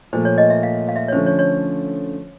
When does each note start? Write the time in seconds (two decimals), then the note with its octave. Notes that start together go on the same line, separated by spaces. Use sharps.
0.13 A#2 F3 A3 C5
0.25 C#5
0.38 D#5
0.50 E5
0.63 F5
0.89 F5
0.96 E5
1.08 C#5
1.12 D3 F3 A3 C#4 C5
1.26 C#5
1.39 C#5